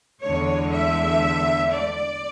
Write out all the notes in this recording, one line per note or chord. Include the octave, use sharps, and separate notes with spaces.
E2 D3 G#3 C#5
E5
D5